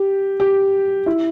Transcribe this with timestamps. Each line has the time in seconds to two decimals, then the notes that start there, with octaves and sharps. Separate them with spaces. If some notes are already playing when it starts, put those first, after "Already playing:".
Already playing: G4
0.40 G4
1.06 E4